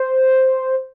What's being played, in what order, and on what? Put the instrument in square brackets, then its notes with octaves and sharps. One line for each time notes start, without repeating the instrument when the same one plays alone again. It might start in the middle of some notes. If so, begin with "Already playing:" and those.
Already playing: [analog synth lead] C5